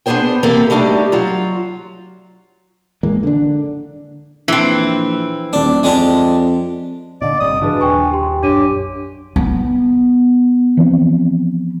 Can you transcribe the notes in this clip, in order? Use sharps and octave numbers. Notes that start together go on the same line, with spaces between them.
B3 D4 F4 G#4 C5 G5
C3 E3 A#3 C4 G4 A4
G3 A3 D4 D#4 G4
F#3 F4
A#1 E3 G#3 A#3
D3 D4
A#1 E3 C4
D#1 D4
F2 G#3 D4 G4
A#2 D3 D5 D#5
G1 G2 C3 D#6
G#2 C#3 E3 D4 F#4 G#4 B4
D#1 G5 G#5 C#6
G4 G5 C6
A#1 F#2 D4 G4 C#5 D#7
B3
E3 F3 C4